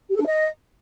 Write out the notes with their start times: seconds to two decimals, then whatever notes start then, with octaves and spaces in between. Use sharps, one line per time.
0.10 G4
0.16 A4
0.21 D4
0.26 D#5